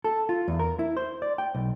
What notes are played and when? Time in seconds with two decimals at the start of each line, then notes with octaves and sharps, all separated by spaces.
0.04 A4
0.29 F4
0.48 E2
0.59 A#4
0.79 E4
0.97 C5
1.22 D5
1.38 G5
1.55 B1